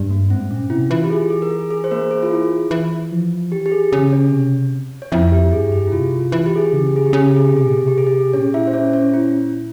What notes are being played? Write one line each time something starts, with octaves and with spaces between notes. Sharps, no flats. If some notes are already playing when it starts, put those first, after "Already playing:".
Already playing: G2
A#3
G#2 C4
A#2 C#4
C3 E4
E3 F4
G4
G#4
G#4
A#4
G#4
G#4
C5
A#3 A#4
G#4
F4
E4
E3
F3
E3 G4
G4
G#4
C#3
C#4 C#5
C3
C#5
F2 E4 E5
G4
G2 G#4
G4
E4
C3 F4
F4
E3
G4
G#4
G4
C#3 G#4
G4
G#4
G4
C#3 G#4
G4
G#4
G4
C3 G#4
A#2 G4
C3 G#4
G4
G#4
G4
A#2 C#4 C#5
E4 E5
C5
C#4 C#5
C#4 C#5
E4